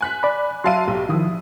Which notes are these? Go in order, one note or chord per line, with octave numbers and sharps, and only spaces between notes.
G#5 F#6 B6
D5 B5
F#3 E5 F5 A5 C6 D#7
B1 G4
D#3 F3 E4 D#6